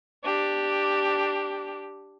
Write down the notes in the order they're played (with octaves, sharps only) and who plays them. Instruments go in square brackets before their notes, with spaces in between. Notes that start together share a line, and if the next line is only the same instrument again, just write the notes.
[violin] D4 G4